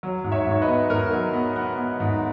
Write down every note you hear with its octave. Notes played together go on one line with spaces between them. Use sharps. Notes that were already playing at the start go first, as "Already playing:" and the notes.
F#3
G#2
C#5 E5
G#2 C#5
B4 D#5
B3
G#2 A#4
F#3
B3
B3
B3
G#2